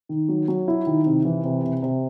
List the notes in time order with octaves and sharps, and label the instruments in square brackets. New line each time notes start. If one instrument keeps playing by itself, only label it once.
[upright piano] D#3
F#3
F#3
E4
D#3
C3
E3
C3
C3
C3